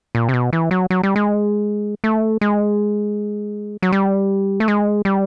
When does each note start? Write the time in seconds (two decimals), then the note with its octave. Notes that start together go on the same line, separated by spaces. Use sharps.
0.15 A#2
0.29 C3
0.33 B2
0.53 E3
0.71 F#3
0.90 F#3
1.03 G3
1.16 G#3
2.04 A3
2.41 G#3
3.82 F#3
3.92 G3
4.60 A3
4.68 G#3
5.05 G3